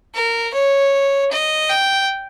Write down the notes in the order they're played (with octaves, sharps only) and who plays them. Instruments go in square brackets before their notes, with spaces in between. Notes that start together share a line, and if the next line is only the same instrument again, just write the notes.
[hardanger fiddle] A#4
C#5
D#5
G5